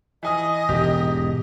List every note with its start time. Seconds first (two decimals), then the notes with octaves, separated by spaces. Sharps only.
0.23 E3 D#5 G#5 D#6
0.69 E1 G#2 G4